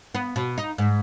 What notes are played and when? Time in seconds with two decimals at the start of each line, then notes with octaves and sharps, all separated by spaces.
0.15 B3
0.36 B2
0.58 D#4
0.78 G#2